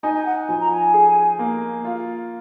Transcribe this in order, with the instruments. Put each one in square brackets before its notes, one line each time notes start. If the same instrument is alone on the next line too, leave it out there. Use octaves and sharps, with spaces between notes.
[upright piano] D#4 [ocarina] G#5
[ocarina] G#5
F#5
[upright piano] F3 [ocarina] G#5
[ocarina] A#5
G#5
[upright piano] G#4
A#3
F4